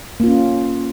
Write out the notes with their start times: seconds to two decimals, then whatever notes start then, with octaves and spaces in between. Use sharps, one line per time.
0.20 A#3
0.24 F4
0.27 C#4